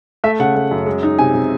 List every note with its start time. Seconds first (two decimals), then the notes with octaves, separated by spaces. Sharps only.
0.24 A3 E5
0.39 C#3 F#5
0.55 A3
0.71 F#2
0.86 G#3
1.03 D#4
1.19 C3 G#5
1.35 C3